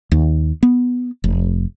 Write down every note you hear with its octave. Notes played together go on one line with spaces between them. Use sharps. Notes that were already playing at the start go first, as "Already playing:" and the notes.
D#2
B3
F1